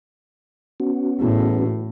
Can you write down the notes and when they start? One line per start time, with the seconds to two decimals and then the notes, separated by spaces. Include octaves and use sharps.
0.80 B3 C#4 F#4
1.21 E2 A2